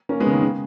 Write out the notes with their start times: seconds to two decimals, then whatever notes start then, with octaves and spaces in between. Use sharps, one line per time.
0.09 A#3 C#4
0.20 G#3 B3
0.27 C#3
0.31 D#3
0.42 C#3